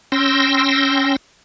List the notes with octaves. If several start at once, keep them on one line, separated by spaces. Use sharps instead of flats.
C#4 G5 C6 E6 A#6